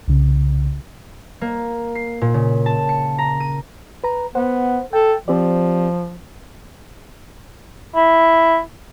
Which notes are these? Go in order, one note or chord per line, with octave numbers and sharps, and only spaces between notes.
C2 C#3
A#3
C7
A#2
C#3
A5
C#7
A#5
D#7
B4 A#5
B3 C5 F#5
A4 G5
F3 C4 G4 D5
E4